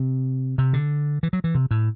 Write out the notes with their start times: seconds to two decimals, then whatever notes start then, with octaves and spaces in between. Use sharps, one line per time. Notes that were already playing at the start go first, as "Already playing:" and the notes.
Already playing: C3
0.58 C3
0.73 D3
1.23 E3
1.33 F#3
1.44 E3
1.55 C3
1.71 A2